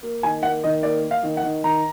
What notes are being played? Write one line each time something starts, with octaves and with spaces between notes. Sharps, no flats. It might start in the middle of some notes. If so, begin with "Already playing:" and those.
A#3
D#3 G#5
A#3 F#5
D#3 D#5
A#3 D5
A#3
F5
D#3
F#5
D#3
D#3 A#5